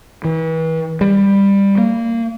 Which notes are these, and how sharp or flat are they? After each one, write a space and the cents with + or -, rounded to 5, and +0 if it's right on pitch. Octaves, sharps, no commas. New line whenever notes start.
E3 -35
G3 +15
A#3 -20